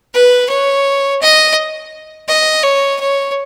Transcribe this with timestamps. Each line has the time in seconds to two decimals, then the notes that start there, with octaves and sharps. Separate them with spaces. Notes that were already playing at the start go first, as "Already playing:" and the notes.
0.14 B4
0.49 C#5
1.21 D#5
2.28 D#5
2.63 C#5
3.00 C#5